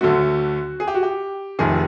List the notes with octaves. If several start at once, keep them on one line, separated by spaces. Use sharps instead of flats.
D2 D3 F#3 A3 F#4
G#4
G4
F#4
G4
F1 F2 C3 D#3 G#4